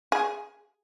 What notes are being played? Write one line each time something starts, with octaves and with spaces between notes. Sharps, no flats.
G#4